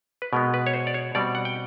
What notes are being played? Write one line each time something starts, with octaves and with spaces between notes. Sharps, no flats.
B4
B2 G#3 B3 A#4
B4
C#5
C5
D5
C#5
B2 G3 C4 D5
F#5
G5